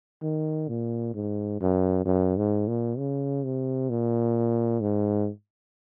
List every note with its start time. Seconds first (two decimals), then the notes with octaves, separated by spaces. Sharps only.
0.22 D#3
0.68 A#2
1.14 G#2
1.60 F#2
2.06 F#2
2.37 G#2
2.68 A#2
2.98 C#3
3.44 C3
3.90 A#2
4.81 G#2